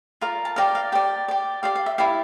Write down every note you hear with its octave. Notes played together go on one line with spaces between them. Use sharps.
F4 A#4 D5
A5
G4 A#4 D5 F5
F5
G4 D5 G5
G4 D5
G4 D5 F5
F5
E5
E4 G4 D5 F5